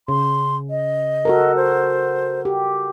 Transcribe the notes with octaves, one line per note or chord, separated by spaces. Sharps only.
C#3 C6
D#5
F#4 A4 A#4
C5
G4